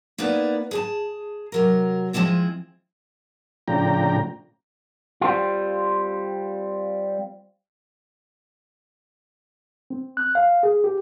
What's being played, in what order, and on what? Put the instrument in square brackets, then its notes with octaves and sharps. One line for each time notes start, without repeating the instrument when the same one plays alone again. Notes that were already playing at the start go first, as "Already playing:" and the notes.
[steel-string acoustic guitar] A#3 B3 D#4 E4 B4 D5
G#4 G#5 A5
C3 F#3 A#4
F3 G#3 C4 E4 D#5
[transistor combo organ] A2 C#3 F3 D4 G5 A#5
[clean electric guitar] G3 C4 F4
[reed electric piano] C4
F#6
F5
G#4
G4